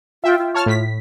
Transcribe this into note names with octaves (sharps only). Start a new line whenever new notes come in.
F4 E5 G5
F4
C#5 A5 F6
A2 B6